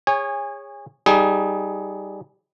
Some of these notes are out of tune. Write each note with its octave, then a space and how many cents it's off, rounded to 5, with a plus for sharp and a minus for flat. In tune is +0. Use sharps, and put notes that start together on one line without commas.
G#4 -30 C#5 -5 G#5 -25
G3 +0 D#4 +0 G#4 +20